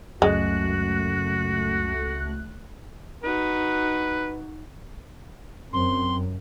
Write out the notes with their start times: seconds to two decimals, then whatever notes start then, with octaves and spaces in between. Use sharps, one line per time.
0.22 C#2 F#2 G#3 A3 F#4 F#6
3.23 D#4 F#4 B4
5.73 F#2 C4 C6